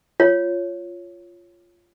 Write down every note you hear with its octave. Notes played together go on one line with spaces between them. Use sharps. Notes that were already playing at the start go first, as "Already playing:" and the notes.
F4 C#5